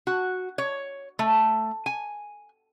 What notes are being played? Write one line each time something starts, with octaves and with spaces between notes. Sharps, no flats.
F#4
C#5
A3
G#5